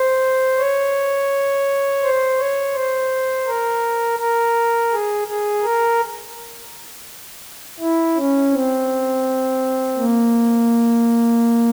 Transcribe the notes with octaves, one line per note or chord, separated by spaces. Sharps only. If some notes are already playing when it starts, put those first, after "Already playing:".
Already playing: C5
C#5
C5
C#5
C5
A#4
A#4
G#4
G#4
A#4
E4
C#4
C4
A#3